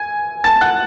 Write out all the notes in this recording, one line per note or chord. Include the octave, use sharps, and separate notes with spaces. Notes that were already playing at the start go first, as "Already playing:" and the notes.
Already playing: G#5 G#6
A5 A6
F#5 F#6